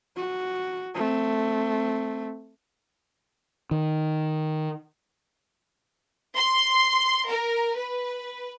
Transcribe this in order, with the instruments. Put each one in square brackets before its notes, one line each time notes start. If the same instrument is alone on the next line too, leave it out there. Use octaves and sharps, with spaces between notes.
[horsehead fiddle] F#4
A3 C4
[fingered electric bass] D#3
[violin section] C6
A#4
B4